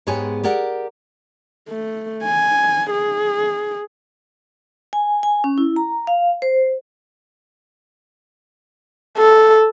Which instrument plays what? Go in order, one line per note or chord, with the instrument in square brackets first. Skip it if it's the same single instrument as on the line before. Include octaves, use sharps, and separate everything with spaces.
[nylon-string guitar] G#2 G#3 B3 G4 C#5 G#5
G4 G#4 A#4 D5 F#5
[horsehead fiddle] A3
G#5
G#4
[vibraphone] G#5
G#5
C#4
E4
A#5
F5
C5
[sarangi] A4